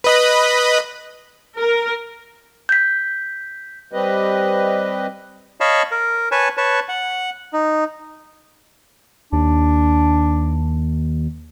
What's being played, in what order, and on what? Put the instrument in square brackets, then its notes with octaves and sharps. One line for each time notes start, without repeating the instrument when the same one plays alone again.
[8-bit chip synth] B4 D#5 B5
[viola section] A#4
[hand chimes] G6 B6
[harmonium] G3 C4 G4 B4 D#5
[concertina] C#5 D#5 F5 A5 B5
A#4
B4 C#5 G#5 A5
B4 C#5 A5
F#5
D#4
[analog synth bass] D#2 [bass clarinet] D4